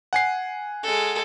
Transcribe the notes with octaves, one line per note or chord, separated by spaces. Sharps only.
F#5 G#5 C7
G#3 A4